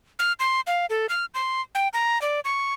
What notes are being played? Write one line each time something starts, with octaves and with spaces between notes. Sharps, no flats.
F6
C6
F5
A4
F6
C6
G5
A#5
D5
C#6